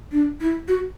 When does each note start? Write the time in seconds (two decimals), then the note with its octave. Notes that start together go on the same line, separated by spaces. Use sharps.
0.12 D4
0.41 E4
0.68 F#4